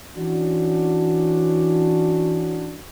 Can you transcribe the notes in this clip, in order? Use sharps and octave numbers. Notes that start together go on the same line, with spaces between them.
E3 C#4 D4 F#4